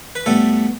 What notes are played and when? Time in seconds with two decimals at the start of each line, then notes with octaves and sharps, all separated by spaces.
0.16 B4
0.26 A2 G3 B3 A4